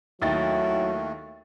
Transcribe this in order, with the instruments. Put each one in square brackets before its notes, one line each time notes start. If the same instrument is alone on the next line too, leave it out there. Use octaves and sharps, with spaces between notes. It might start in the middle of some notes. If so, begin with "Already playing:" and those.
[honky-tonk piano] D#2 D#4 A6 [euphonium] F#3 [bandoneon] A3 [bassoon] E4